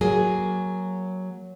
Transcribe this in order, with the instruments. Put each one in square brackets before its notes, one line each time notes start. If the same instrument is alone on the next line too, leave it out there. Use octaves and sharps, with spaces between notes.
[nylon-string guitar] F#3 A#3 G#4